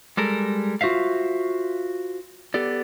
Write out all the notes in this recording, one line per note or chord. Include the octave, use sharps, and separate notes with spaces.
G3 G#3 A4 A#4
F4 F#4 C5 E5 F5
B3 G4 A4 D5